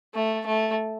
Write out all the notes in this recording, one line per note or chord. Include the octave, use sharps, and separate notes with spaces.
A3
A3